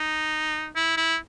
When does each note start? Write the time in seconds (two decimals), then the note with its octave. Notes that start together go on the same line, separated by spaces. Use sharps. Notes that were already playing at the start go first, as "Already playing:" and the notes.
Already playing: D#4
0.76 E4
0.97 E4